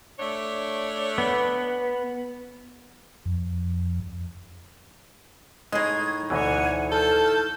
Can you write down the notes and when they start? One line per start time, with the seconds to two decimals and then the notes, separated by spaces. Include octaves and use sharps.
0.19 A3 D4 C#5
1.18 B3
3.25 F2
5.72 A2 G#3 D#4 G#4 G#6
6.30 D2 B2 E3 C#5 F#5 G#5
6.92 A4 A5 F6 G6